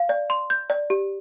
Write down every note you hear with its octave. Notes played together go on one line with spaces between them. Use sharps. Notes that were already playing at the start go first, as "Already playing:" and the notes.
Already playing: F5
D5
C6
G6
D5
G4